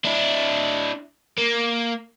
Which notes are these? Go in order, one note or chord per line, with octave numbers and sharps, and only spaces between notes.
D4 E4
A#3